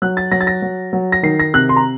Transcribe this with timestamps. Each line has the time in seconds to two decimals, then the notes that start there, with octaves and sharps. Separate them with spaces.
0.02 F#3 F#6
0.17 A6
0.32 F#3 A#6
0.41 A6
0.47 A#6
0.62 F#3
0.93 F#3
1.12 A#6
1.23 D#3 C7
1.39 A#6
1.54 C3 F#6
1.69 C6
1.76 A#5